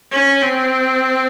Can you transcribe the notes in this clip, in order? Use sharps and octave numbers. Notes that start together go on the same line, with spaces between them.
C#4
C4